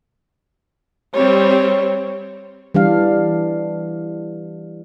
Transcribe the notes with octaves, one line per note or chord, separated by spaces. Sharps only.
G3 C4 C#5
E3 G3 D4 F5